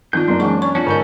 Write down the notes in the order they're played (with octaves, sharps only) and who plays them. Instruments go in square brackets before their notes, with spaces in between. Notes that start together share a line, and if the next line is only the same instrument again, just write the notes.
[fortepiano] D#3 F3 [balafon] C4 F4 [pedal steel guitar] D4 G6
[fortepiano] F#2 A#3 D#4 [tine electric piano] C6
[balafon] E3 F#5 C#6 [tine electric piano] G#3 C#4
[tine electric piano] C#4 C#5 [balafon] C#6
[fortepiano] F3 [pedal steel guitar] C#4 F#4 A4 [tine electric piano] D4 [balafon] C#5
[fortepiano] G#2 [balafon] D3 A#4 D#5 [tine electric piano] C#5 G6